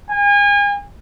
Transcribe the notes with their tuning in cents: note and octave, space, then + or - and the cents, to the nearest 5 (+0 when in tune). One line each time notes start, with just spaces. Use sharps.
G#5 -35